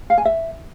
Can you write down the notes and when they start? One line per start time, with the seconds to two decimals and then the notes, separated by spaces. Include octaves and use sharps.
0.10 F5
0.18 G#5
0.25 E5